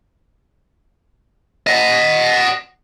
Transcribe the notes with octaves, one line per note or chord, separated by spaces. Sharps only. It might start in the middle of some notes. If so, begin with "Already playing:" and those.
D#5 F#5